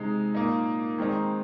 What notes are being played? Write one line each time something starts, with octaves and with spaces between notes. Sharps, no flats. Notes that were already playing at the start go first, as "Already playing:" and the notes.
Already playing: C3 G#3 D#4
A#2 A#3 D#4
D#3 G#3 C4 D#4